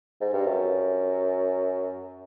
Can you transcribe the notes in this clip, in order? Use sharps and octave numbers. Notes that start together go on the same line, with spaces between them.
G#2
G2
F#2